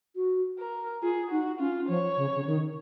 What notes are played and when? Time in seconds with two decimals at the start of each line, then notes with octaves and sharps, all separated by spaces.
0.16 F#4
0.59 A#4
1.02 F4 G#4
1.31 D#4 F#4
1.59 C#4 F4
1.89 F3 C#5
2.17 C#3
2.36 C#3
2.46 D#3